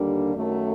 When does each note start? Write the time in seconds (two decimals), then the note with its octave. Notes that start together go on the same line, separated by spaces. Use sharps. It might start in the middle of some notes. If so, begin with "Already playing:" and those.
Already playing: D#2 D3 G3 A#3 D4
0.35 F#2 D#3 F#3 A3